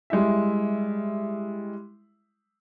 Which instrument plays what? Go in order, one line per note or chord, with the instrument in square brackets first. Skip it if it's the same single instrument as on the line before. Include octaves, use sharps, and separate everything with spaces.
[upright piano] G3 G#3 E4 E5